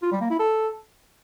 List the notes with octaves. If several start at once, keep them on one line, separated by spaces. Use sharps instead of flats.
F4
G3
A#3
E4
A4